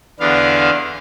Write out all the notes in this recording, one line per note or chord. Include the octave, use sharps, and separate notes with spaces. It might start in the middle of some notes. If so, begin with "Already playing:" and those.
E2 D3 B3 D4 F5